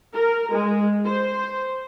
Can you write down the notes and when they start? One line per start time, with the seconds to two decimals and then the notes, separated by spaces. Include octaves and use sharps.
0.14 A#4
0.53 G#3
1.05 C5